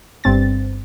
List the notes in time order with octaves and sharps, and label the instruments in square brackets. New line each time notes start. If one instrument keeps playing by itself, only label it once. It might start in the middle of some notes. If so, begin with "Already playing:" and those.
[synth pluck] G1 G2 C4 A6